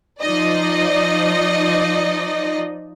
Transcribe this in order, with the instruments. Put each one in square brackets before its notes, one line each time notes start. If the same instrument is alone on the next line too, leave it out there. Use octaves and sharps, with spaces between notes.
[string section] F3 D#4 D5 D#5